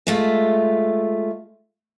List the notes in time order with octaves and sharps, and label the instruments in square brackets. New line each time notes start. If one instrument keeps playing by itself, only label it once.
[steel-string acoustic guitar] G#3 A3 F4